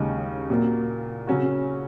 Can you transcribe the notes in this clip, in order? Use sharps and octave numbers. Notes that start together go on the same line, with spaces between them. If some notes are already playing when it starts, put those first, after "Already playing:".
Already playing: D#2 C#3 G#3 D#4
A#2 F#3 A#3
C#3 F#3 C#4 F#4